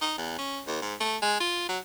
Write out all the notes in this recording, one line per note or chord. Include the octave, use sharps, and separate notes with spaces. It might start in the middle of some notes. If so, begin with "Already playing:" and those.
D#4
E2
C#4
D#2
G#2
A3
G#3
F4
F#3